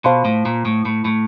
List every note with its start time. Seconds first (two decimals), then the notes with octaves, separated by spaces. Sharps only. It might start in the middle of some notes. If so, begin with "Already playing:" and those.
0.04 B2 C5 F5 A5 C6
0.25 A2
0.45 A#2
0.65 A2
0.85 A2
1.05 A2